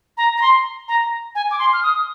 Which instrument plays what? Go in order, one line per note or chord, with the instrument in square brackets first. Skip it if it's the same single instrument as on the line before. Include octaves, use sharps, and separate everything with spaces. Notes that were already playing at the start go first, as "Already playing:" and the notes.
[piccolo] A#5
A#5
C6
A#5
G#5
D6
C6
F6
D#6